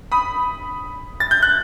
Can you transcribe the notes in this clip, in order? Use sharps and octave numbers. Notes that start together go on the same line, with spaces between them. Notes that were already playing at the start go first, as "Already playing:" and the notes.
B5 D#6
A6
G6
F#6